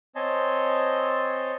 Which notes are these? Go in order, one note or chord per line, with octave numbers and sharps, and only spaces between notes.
C4 C#5 D#5 G#5 A5 C6